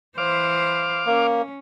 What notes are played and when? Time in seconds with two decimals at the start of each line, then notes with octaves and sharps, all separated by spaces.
0.18 E3 C5 F5 D6
1.06 A#3 C#4